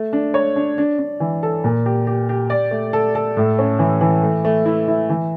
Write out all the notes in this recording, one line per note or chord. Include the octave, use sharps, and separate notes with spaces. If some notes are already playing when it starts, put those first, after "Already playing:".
Already playing: A3
D4
C#5
D4
D4
D4
E3
A4
A#2
G4
G4
G4
D5
A3
A4
A4
A2
C#4
E3
E3
A3
A3
E4
E4
E3